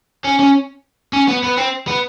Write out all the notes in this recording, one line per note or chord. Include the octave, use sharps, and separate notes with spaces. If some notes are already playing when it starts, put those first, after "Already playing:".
C#4
C#4
C#4
B3
B3
C4
B3